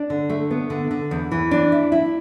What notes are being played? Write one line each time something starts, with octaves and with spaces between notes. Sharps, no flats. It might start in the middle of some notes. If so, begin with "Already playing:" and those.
Already playing: D4
D3
A3
B3
D3
D3
E2
E3
D4
E4
E4